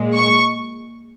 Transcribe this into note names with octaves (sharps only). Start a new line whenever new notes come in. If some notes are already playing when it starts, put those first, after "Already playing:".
Already playing: A#2 G#3
C#6